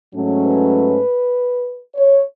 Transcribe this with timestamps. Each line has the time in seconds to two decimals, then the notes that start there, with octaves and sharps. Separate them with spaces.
0.14 G#2 F#3 A3 C#4
0.45 B4
1.95 C#5